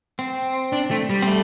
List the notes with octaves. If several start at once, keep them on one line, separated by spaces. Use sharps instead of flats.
C4
D4
A3
G3
C4
A3